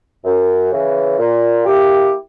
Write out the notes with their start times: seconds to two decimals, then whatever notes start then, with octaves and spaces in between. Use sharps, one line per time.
0.24 F#2
0.71 C#3 E3
1.18 A#2
1.65 A#3 E4 G4